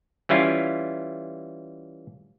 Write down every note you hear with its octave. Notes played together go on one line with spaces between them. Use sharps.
E3 G3 C#4 E4 F4